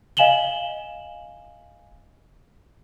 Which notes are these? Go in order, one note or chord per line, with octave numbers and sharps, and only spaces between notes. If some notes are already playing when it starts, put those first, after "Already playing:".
D#5 F5 G#5 E7 F#7 G7